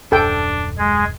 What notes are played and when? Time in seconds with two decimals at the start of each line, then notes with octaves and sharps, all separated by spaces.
0.12 D#1 F#2 D4 A4 G5
0.78 G#3 G#4